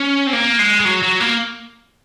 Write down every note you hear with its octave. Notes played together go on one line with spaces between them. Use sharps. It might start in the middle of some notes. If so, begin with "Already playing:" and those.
Already playing: C#4
C4
A#3
G#3
G#3
F#3
F#3
A#3